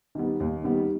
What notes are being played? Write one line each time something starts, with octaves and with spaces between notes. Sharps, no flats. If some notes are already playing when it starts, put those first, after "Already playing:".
D#3 G3 B3
D#2
D#3 G3 B3